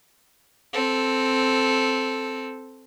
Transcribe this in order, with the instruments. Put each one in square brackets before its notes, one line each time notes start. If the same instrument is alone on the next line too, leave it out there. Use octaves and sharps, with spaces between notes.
[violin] C4 A4